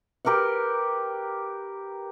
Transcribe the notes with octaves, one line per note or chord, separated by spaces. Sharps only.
G4 A#4 B4 F#5